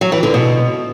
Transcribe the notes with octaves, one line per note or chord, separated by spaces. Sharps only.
F#3
E3
D3
B2